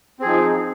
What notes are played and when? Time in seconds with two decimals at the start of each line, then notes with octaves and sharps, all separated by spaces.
0.19 C4
0.22 G#4
0.25 F3
0.28 D#4